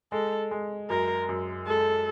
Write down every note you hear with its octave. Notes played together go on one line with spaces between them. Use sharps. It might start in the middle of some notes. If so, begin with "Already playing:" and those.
G#3 A4
G#3
F#2 A#4
F#2
G#3 A4